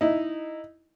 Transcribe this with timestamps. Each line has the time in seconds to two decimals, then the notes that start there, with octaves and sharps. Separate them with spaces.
0.01 D#4 E4